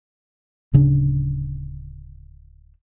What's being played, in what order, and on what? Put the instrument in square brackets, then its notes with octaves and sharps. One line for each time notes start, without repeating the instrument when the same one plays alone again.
[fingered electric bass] D1 C#3 D4